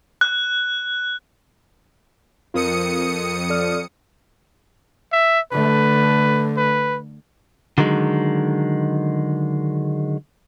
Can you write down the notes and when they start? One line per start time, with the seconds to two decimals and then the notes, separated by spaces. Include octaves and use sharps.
0.21 F#6
2.54 F2 F4 A#4 D#6 C#7
3.50 A4 D5 F6
5.12 E5
5.52 D3 A3 B4
6.57 B4
7.78 D3 D#3 F#3 G#3